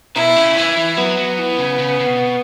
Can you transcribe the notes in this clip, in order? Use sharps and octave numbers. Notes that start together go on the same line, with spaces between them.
B2 E4
C#3
E3 E4
E3
F#3 B3
F#3
E3
C#3
C#3
C#3
B2